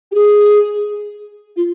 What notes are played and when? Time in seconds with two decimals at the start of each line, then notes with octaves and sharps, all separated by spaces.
0.12 G4
0.15 G#4
1.56 F4